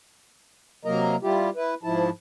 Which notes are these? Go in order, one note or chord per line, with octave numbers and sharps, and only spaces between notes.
C3 F#3 A#3 A#4 D#5 A#5
G3 E4 F4 G4
E4 B4
G#2 F3 E4 A5